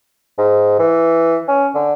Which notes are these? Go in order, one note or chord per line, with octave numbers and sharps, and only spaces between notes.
G#2
E3
C#4
D3